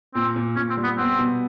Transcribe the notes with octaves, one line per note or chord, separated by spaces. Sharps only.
A#2 C4
A#2
A#2 C#4
C4
G3
B3
B3 C4
B2